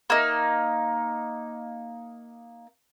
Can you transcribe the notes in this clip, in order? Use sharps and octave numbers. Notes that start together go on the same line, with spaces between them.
A#3 D#4